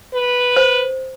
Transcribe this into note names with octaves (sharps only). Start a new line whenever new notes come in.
B4
C5